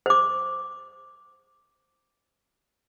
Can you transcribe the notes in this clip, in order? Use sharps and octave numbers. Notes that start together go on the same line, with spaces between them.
C5 D6